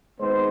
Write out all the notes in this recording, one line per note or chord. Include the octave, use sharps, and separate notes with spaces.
G#1 G#2 G#3 B3 C5